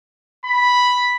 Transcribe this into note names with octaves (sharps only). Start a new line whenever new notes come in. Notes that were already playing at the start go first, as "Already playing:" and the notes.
B5